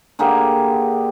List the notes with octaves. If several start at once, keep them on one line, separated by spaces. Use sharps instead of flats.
D3 A#3 G4 G#4